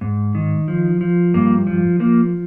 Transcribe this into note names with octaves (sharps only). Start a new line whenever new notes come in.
G#2
D#3
F3
F3
G2 A#3
F3
F3 A#3